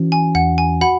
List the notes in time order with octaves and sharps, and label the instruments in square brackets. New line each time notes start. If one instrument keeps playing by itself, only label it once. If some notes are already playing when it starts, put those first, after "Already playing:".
Already playing: [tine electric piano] E3 C#4 F#4
[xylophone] G#5
[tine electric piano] E2 [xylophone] F#5
[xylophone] G#5
[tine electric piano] F#4 [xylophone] F#5 B5